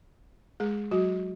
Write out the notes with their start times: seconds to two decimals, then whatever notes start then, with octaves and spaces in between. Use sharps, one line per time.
0.60 G#3 G#4
0.91 F#3 F#4